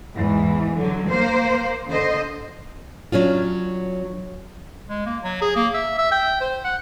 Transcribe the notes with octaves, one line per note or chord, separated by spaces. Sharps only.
E2 G#2 E3
D3 F#3
A#3 C5
D3 C5 D#5
F#3 C#4 D4 F4
G#3
A#3
F#3
G#4
A#3
E5
E5
G5
C5
F#5